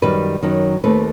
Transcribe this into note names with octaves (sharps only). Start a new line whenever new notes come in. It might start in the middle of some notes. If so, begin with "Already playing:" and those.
F#2 D#3 G3 B4
F#2 D#3 F#3
D#2 D#3 A3 C4 B4